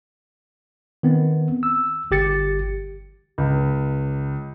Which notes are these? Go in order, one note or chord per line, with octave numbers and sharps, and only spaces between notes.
D#3 B3 C4
E6
G1 G4 A6 C#7
C#2